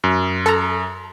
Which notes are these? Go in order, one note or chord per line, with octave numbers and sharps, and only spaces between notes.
F#2
A4 A#5